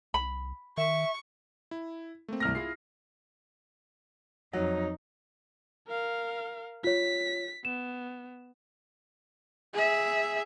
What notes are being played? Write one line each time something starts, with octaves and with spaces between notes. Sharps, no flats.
C2 B5
D#3 E5 C#6
E4
A3 A#3 C4
C2 F6 A#6
E4 F4 G#4 C7
F2 F#3 D#4
A#4 F5
F4 C#5 B6
B3 E7
G#4 E5